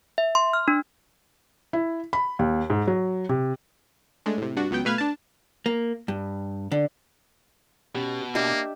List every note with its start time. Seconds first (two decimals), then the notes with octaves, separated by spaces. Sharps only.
0.18 E5
0.35 C6
0.53 F6
0.68 D4
1.73 E4
2.13 B5
2.39 D#2
2.70 G#2
2.87 F#3
3.29 C3
4.26 G#3 A3 D4
4.38 A2 C3
4.56 G2 D4 F#4
4.71 C#2 F#3 B3 G5
4.85 B2 A3 B4 F5 F6 G#6
4.98 D4 A5
5.66 A#3
6.08 G2
6.72 D3
7.95 B2 C#4 G4
8.35 A#3 D4 G4 D#5 E5 D6